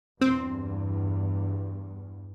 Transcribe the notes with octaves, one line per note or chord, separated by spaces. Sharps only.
E2 G2 C4